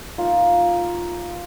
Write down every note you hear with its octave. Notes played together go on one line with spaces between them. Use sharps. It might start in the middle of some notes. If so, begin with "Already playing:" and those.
A#3 D#4 F4